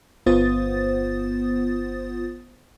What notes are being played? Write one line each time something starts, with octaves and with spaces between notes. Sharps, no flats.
G1 B3 F4 C5 D#6 A6